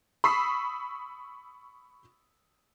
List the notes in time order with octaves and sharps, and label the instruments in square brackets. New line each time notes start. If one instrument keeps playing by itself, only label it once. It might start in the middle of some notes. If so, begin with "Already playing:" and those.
[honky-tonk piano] B5 C#6 D#6 E6 B6 C7